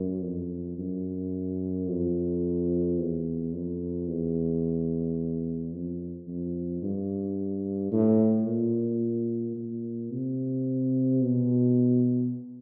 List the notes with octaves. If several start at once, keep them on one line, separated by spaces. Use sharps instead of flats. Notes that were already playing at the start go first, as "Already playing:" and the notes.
Already playing: F#2
F2
F#2
F2
E2
F2
E2
F2
F2
G2
A2
A#2
A#2
C3
B2